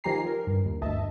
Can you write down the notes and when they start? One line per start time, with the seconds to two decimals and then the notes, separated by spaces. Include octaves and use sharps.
0.04 D#3 F3 G4 G#5 A#5 C7
0.26 A#4
0.47 G2
0.65 D#2
0.81 G1 D2 D#5 E5 A5